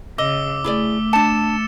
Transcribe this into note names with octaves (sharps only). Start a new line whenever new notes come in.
C#3 D#5 D6 E6 G7
A3 E4 G#4 D5
D4 A5 A6 C#7 E7